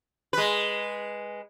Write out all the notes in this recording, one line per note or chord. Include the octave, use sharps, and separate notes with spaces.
G#3 B4